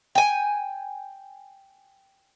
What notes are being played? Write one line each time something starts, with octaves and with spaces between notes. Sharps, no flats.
G5 G#5